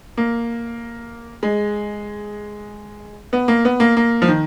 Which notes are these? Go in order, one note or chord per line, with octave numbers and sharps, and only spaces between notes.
A#3
G#3
B3
A#3
B3
A#3
A#3
F3
D#3